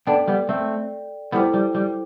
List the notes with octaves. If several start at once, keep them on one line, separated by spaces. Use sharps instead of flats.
B3 D4 A4 D5 G5
G3 B3
A3 C4
G3 B3 E4 A4 C5 G5 D6
G3
G3